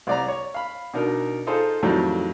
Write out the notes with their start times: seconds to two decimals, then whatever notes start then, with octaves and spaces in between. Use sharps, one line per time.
0.07 C2 D5 A#5
0.28 C#5
0.54 F5 B5
0.94 B2 D4 D#4 A#4
1.47 D#4 F4 G#4 A4 C5 D#5
1.83 F2 A2 D#3 F#3 G3